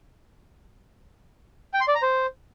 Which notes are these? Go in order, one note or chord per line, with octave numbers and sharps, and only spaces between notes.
G5
C6
D5
A#5
C5